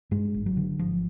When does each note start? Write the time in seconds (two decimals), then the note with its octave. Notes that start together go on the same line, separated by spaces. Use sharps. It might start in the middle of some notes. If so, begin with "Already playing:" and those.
0.11 G2 G#3
0.34 G#1
0.46 F#3
0.57 D3
0.79 G#1 F3